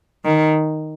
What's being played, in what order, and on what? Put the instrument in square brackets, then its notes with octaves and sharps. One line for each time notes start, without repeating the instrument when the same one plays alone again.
[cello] D#3